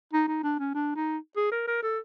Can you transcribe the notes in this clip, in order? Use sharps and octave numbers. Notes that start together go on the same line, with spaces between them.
D#4
D#4
D4
C#4
D4
D#4
G#4
A#4
A#4
A4